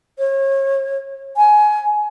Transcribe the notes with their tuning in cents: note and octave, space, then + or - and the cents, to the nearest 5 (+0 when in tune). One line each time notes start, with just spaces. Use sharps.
C#5 -35
G#5 +20